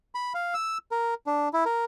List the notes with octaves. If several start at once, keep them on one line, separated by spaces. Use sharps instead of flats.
B5
F5
E6
A#4
D4
E4
A#4